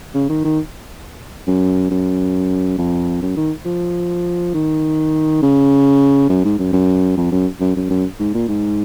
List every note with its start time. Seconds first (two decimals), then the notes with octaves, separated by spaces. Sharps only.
0.15 C#3
0.29 D#3
0.44 D#3
1.47 F#2
1.91 F#2
2.79 F2
3.22 F#2
3.37 D#3
3.66 F3
4.55 D#3
5.42 C#3
6.29 F#2
6.45 G#2
6.59 F#2
6.73 F#2
7.18 F2
7.32 F#2
7.61 F#2
7.76 F#2
7.90 F#2
8.20 G#2
8.35 A#2
8.48 G#2